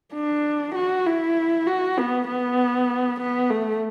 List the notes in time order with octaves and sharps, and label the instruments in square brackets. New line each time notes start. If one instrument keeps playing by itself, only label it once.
[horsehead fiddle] D4
F#4
E4
F#4
B3
B3
B3
A3